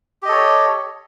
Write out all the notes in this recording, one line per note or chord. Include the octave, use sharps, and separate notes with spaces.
G4 A4 C#5 D#5